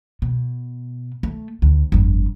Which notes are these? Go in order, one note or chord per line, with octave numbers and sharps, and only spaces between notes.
B2
A3
D2
G1 F2